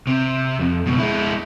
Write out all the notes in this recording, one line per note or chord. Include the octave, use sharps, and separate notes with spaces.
C3
F2
C#2 B2
G#3 E4